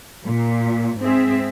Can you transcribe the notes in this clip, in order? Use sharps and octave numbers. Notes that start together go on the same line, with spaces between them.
A#2
G#2 C4 G#4 E5